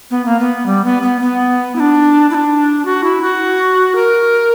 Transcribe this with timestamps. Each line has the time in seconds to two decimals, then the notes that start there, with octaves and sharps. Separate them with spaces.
0.11 B3
0.26 A#3
0.39 B3
0.66 G3
0.84 B3
1.02 B3
1.21 B3
1.76 E4
1.80 D4
2.31 E4
2.35 D4
2.85 F#4
3.04 E4
3.22 F#4
3.95 A#4